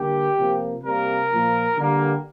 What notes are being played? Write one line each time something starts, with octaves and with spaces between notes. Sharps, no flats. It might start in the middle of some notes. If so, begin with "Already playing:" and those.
Already playing: D3 G3 A#3 G4
C3 F3 A#3
C3 G3 A#3 A#4
A#2 F3 A#3
D3 G3 A#3